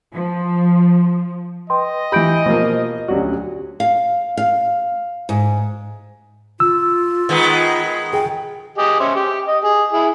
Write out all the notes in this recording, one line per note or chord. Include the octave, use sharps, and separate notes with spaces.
F3
B4 D#5 G5 C6
E3 G4 B5 G6 D7
B2 F3 A#3 C5
D2 F#3 C#4 F#4 G4 D5
F5
F5
G#2
F4 E6
D#3 G#3 B3
G#4 G5
G4 G#4 D#5
C#4 C5 E5
G4
D#5
G#4
E4 G#4